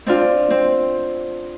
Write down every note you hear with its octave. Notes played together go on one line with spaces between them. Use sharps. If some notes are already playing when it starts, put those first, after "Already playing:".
C4 D4 F4
C4